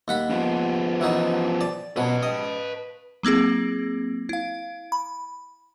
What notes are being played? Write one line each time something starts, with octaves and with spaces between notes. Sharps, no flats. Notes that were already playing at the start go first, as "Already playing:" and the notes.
D#2 F#5 B5
F3 B3
E3 F#3 D#4
D5
B2 F#3 B4 A5
D#5
F#3 A#3 C4 E4 G#4
E4 F5
B5